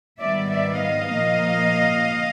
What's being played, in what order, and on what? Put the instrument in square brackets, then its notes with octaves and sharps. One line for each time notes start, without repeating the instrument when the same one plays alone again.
[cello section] G#2 D#3 G3 B3 D5 E5
D5 E5
D#5 F5
A#2 F3 A#3